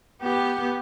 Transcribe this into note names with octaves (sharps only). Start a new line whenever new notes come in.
B3 G4